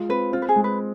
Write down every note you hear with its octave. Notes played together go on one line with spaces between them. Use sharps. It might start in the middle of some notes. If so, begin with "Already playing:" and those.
Already playing: G#3 F4
C4 B4
C4 F4
B4
G#4
G#3
B4